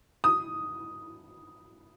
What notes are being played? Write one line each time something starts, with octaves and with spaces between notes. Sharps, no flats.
D#6